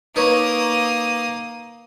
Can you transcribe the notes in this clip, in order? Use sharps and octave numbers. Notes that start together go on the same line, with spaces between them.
A#3 D#4 B4 C#5 D#6